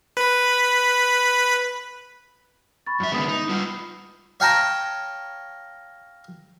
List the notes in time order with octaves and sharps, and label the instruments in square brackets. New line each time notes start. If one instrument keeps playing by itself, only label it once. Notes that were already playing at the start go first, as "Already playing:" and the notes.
[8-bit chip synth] B4 B5
[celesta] B5 C#6 A6
[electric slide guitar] F#2 E5
[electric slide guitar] D#3 G#3 B3 [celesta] B5 D#6
[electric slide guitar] D#4
G3 F4
[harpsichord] C#5 F5 G5 A5 A#5